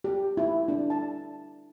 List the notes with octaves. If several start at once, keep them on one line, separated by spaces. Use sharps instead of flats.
G4
E4
D4
A5